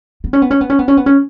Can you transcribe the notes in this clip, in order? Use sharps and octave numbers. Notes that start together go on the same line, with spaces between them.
B3
C#4
B3
C#4
B3
C#4
B3
C#4
B3
C#4